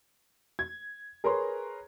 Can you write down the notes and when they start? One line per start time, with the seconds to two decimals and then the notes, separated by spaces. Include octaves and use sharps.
0.59 G#6
1.24 G#4 A#4 B4 C#5 A#5 C6